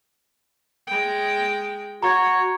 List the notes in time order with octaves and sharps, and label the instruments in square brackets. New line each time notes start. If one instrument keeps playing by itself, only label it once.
[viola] G#3 G5
[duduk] F#4 [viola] C#5 [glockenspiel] A#5 C#6 G#6